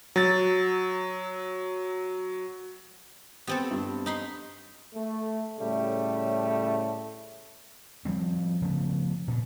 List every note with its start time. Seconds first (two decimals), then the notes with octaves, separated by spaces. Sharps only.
0.16 F#3 A6
3.47 B3 C4 G4 A4
3.71 G2
4.06 D#4 B5 C6
4.94 A3
5.59 A2 C#3 G3 A3
8.05 F3 G3 C4
8.62 C#3 F3 A3 B3
9.28 G2 A#2